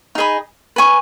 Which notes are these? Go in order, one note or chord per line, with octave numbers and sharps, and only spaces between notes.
D#4 G#4 D#5 B5
B4 G#5 C#6